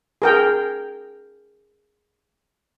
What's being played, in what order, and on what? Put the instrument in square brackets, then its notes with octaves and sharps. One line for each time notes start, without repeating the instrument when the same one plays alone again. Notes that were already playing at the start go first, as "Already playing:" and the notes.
[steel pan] G#4 A#4 G5